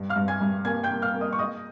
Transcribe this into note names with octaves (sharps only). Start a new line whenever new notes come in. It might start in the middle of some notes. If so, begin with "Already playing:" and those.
Already playing: G2
F5 F6
G2
G#5 G#6
G2
A#3 G#5 G#6
G5 G6
A#3
F5 F6
A#3
D#5 D#6
C#6
G#3 D#5 D#6